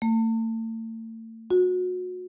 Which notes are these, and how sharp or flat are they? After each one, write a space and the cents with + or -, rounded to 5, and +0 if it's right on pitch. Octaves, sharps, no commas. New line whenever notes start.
A3 +40
F#4 -25